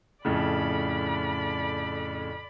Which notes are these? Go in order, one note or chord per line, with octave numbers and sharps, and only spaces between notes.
F2 A2 C#3 D5 B5